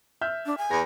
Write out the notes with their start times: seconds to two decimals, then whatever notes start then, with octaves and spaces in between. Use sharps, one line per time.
0.21 E5 F6 G6
0.46 D4
0.58 G#5
0.71 E2 A#6